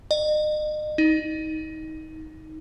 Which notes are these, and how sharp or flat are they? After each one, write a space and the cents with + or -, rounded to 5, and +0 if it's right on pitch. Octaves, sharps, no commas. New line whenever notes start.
D#5 -40
D#4 +20